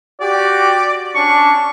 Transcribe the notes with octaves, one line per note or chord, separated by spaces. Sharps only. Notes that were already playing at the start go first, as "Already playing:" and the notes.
F#4 G4 D5
C#4 D4 C#6